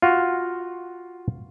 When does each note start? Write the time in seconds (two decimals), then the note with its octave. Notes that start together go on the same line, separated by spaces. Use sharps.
0.02 F4 F#4